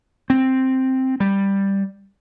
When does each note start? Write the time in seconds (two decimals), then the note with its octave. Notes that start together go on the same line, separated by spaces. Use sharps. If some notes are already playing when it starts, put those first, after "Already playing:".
0.30 C4
1.20 G3